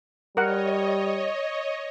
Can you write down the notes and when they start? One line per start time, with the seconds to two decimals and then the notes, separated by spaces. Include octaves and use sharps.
0.37 G3 A#4 C#5 D#5 F#5